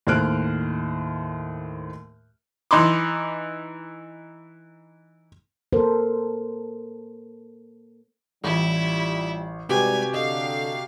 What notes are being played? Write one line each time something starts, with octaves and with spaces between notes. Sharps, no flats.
D#2 A2 C5 F6 F#6 D7
E3 D#4 B5 C6 D6
A#3 A4 A#4 C5
A1 G3 E4 F4
G#2 C3 G3 G#3 F#4 G4 B4 G#5
D3 A4 D#5 F5